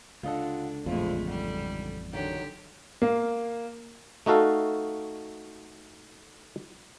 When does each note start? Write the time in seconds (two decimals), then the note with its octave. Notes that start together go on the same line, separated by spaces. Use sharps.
0.23 C#2 D3 D4 F4 A4 D#5 F#5
0.86 A1 F2 A#2 G#3 A3 C4 E4
1.27 G#2 G3
2.13 D3 D#3 F3 F#3 G4
3.02 A#3
4.26 A3 D#4 F#4 A4 F5